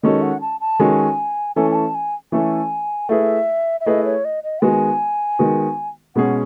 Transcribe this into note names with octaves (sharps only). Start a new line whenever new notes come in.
D#3 G#3 C#4 F#4 A4 D#5
F#5
A5
A5
D#3 G#3 C#4 F#4 A4 G#5
E3 A3 C#4 E4 A4 G#5
G#5
A5
G#5
E3 A3 C#4 E4 A4 G#5
A3 E4 G#4 B4 E5
E5
A3 E4 G#4 B4 D#5
C#5
D#5
D#5
D#3 G#3 B3 F#4 G#5
D#3 G#3 B3 F#4
B2 G#3 C#4 G#4 F#5